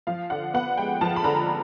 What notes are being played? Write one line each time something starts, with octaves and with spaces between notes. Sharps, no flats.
F3 F5
D3 F#5
B3 F#5
G#3 G5
F3 A5
B5
D3 A#5